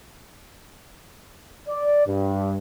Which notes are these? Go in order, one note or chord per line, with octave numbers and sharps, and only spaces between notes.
D5
G2